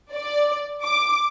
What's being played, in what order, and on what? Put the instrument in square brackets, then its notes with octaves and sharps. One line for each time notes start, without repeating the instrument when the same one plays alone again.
[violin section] D5
D6